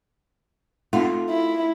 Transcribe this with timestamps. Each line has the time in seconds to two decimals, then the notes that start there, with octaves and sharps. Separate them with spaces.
0.93 A3 C4 D#4 F4 F#5
1.30 E4